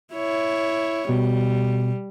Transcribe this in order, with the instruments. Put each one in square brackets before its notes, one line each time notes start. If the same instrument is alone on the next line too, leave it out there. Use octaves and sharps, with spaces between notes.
[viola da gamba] E4 C#5
[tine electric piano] B2 [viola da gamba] G3